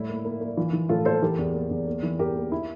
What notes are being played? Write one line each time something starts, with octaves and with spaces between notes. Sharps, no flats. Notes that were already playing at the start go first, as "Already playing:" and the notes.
Already playing: A2 G3 E4
A#3
A#3
A#3
E3 F4
E3
A2 F4 A4
A#3 A4 C5
E3 G4 A#4
E2
A#3
E2
A#3
E3
E2 G4 A#4
A#3
E4